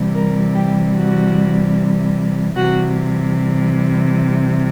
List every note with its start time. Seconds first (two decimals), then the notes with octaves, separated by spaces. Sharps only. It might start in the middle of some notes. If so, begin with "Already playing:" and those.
Already playing: C3 E3 G3
0.15 A#4
0.55 G4
0.95 F#4
2.56 C3 E3 G3 F#4